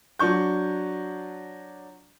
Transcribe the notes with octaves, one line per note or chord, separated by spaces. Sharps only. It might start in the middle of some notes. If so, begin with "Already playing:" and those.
F#3 D4 C#6 G6